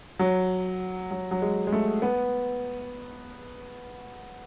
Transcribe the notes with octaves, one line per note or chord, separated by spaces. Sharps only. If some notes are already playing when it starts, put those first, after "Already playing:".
F#3
F#3
F#3
G#3
G#3
A3
B3